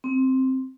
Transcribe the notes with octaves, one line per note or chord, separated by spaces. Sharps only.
C4